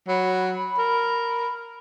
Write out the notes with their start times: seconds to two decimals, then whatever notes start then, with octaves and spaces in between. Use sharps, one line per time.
0.08 F#3 B5
0.78 A#4